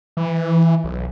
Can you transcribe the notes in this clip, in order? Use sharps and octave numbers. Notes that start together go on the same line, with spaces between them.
E3
B1